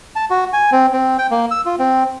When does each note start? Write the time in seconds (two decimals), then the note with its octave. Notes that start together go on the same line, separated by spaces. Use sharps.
0.16 A5
0.30 F#4
0.53 G#5
0.72 C4
0.93 C4
1.18 G5
1.31 A#3
1.51 E6
1.65 F4
1.79 C4